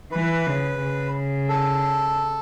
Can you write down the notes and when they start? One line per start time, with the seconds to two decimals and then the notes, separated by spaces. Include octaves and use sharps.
0.12 E3 B4
0.47 C#3
0.80 C#3
1.49 A4